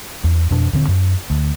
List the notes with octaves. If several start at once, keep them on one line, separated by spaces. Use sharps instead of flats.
E2
F2 B2 D4
D#1 D3 C4
F#2
D2